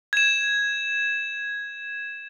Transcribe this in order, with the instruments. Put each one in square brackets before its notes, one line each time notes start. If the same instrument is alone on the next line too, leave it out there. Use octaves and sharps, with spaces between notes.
[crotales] G#6 E7